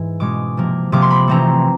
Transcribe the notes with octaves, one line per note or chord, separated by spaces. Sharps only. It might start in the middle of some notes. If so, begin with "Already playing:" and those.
Already playing: G#2 E3
B2 G#3 C#4 D6
C3 F3 A#3
C3 F3 A#3 D6
C6
B5
C3 E3 A3 C4 A#5